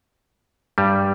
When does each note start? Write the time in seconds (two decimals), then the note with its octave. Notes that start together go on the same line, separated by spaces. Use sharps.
0.78 G2 G3